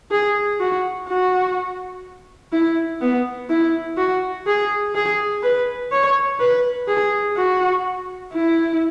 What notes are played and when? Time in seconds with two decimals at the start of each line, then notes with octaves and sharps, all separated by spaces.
0.11 G#4
0.60 F#4
1.08 F#4
2.52 E4
3.01 B3
3.50 E4
3.97 F#4
4.46 G#4
4.95 G#4
5.43 B4
5.91 C#5
6.40 B4
6.88 G#4
7.36 F#4
8.33 E4